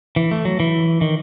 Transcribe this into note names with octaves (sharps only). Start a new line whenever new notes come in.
E3
A3
F#3
E3
D#3